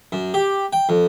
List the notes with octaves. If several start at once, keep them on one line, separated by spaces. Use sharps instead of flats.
F#2
G4
G5
F2